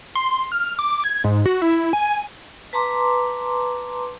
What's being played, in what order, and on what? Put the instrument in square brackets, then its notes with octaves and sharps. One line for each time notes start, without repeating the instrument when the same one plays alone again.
[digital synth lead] C6
F6
D6
G#6
G#2
F#4
E4
G#5
[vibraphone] B4 A5 A#5 C6 D6